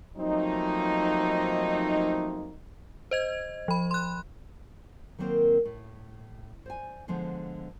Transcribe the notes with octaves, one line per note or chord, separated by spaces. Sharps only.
F3 F#3 A3 A#3 C4 D#4
C5 D#5 G#6
F3 B5
C6 F#6
D#3 F#3 A#3 C4 A#4 C5
A2
C5 D5 G#5
D3 F3 G#3 B3 C5